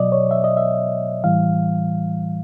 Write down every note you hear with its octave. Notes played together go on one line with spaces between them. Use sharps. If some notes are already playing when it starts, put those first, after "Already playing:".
Already playing: B2 F#3 D5 D#5
C#5
E5
D#5
E5
A2 E3 G3 F5